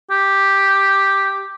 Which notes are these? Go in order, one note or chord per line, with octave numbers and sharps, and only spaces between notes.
G4